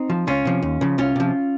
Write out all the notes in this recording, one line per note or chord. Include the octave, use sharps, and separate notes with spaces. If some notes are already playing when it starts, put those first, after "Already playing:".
Already playing: C4 D#4
F3
C#2 C#4 F4
C3 F3
D#2
C#3 F3
C2 C#4 F4
C3 F3